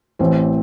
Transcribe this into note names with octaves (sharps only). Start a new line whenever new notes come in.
A1 A2 E3 C4 C5